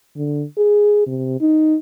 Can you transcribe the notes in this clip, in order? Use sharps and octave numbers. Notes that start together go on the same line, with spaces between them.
D3
G#4
C3
D#4